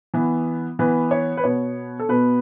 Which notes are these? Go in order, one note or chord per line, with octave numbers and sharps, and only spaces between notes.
E3 B3
E3 B3 B4
C#5
B4
B2 B3 C#5
A4
B2 B3 B4